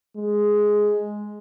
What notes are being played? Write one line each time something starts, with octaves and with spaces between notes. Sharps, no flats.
G#3